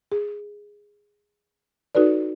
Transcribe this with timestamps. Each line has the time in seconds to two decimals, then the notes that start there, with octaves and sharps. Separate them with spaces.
0.12 G#4
1.95 D#4 F#4 A4 B4 D5